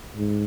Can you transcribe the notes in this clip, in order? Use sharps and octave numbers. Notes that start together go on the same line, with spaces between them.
G#2